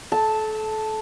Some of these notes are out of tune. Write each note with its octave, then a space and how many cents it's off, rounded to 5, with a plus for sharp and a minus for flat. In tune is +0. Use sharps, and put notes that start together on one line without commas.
A4 -30 A5 +0